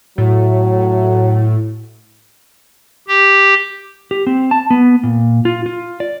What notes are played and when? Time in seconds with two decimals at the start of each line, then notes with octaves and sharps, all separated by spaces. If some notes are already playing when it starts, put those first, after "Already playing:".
0.18 A2 F#3
3.08 G4
4.11 G4
4.27 C4
4.51 A5
4.70 B3
5.03 A#2
5.45 F4
5.66 F4
6.00 D5